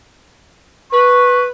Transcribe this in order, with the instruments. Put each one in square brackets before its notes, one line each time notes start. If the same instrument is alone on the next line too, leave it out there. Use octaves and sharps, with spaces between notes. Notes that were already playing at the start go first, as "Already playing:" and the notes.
[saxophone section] B4 [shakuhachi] C#6